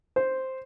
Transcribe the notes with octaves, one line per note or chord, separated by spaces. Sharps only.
C5